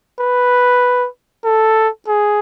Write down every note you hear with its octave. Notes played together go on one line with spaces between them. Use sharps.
B4
A4
G#4